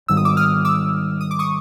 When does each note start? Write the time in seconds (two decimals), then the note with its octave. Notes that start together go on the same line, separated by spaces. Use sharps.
0.08 G#2 D#3 G3 E6
0.17 D#6
0.25 D6 E6
0.37 D#6 F6
0.65 D6 E6
1.21 D#6
1.31 D6
1.39 C#6 D#6